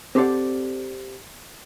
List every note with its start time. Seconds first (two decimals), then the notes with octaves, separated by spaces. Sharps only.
0.15 C4 G4 A4 C5 D5 F#5